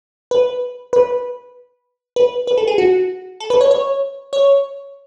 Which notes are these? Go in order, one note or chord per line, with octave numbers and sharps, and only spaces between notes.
B4
B4
B4
B4
A4
G#4
F#4
A4
B4
C#5
C#5
C#5